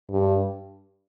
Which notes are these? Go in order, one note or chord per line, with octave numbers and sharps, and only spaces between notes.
G2